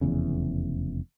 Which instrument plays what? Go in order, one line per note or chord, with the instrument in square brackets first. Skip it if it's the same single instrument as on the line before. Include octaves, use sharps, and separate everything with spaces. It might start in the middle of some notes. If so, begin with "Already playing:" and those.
[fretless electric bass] F1 E2 C#3